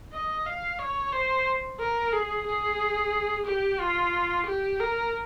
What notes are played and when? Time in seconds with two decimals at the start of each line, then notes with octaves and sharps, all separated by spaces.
0.13 D#5
0.46 F5
0.79 C#5
1.13 C5
1.80 A#4
2.13 G#4
2.46 G#4
3.46 G4
3.80 F4
4.46 G4
4.80 A#4